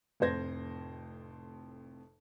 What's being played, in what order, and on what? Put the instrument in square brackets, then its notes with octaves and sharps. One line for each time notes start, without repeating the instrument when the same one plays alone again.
[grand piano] F1 F2 A2 C5 G#6 A#6